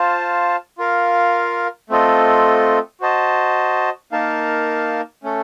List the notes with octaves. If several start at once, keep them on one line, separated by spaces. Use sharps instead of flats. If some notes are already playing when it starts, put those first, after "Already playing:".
Already playing: F4 C5 F5 A5
F4 A#4 F5
A3 C4 F4 A4 D#5
F#4 C5 D#5 A5
A#3 D#4 A#4 F5 A5
A3 C#4 A4